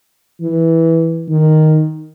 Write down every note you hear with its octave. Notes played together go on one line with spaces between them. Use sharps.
E3
D#3